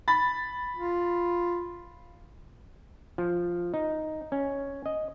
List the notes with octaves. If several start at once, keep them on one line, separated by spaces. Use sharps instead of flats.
B5 A6
F4
F3
D#4
C#4
D#5